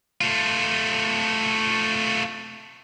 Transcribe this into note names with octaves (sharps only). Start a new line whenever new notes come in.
A3 F4